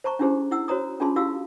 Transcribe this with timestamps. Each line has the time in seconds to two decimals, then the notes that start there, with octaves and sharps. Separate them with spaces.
0.04 C5 A5 A#5 C#6
0.19 C#4 D4 E4 G4 G#4 C5
0.51 E4 F#5 E6
0.68 F#4 C5 C#5 A#5 D#6
1.00 C#4 D4 F4 G#4 A5 C6
1.16 E4 F#4 G4 F5 E6